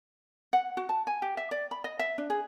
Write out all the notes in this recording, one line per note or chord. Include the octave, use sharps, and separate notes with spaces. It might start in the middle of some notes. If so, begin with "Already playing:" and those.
F#5
F#4
A5
G#5
G4
E5
D5
B5
D#5
E5
D4
G#4